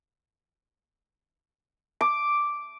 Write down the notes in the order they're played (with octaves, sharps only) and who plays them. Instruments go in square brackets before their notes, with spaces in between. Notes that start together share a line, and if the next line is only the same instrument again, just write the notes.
[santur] D6